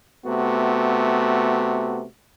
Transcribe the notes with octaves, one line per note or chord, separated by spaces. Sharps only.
C3 A3 B3 F#4